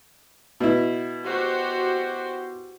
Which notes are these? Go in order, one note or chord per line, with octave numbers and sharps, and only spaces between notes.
B2 E4
F#4 G4 C5